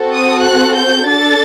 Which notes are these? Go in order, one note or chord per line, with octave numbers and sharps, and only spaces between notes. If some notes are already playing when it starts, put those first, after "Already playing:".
Already playing: C4 F#4 A4
D#6
F#6
G6
D4 A4 A6